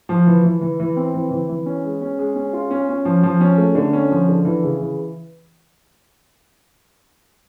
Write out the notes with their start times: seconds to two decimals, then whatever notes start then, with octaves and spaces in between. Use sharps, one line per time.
0.09 F3
0.26 E3
0.44 E3
0.61 E3
0.80 E3
0.96 C4
1.14 E3
1.31 E3
1.49 E3
1.66 C#4
1.84 G#3
2.01 C#4
2.19 G#3
2.36 C#4
2.53 F4
2.71 C#4
2.89 C#4
3.05 F3
3.23 F3
3.41 C#4
3.58 A3
3.75 D3
3.93 C#4
4.11 F3
4.29 D3
4.45 E3
4.64 C#3
4.80 E3